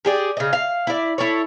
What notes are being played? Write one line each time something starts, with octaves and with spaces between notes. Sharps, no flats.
G4 G#4 D5
C#3 D#5
F5
E4 D5
E4 A4 C#5